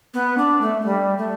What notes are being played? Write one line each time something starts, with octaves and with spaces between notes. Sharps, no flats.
B3
D4
A3
A3
G3
A3